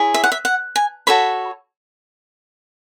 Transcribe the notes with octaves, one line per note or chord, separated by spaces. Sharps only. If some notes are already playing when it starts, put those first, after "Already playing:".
Already playing: E4 G#4 C#5
E5
F#5
E5
F#5
G#5
F#4 A4 C#5 B5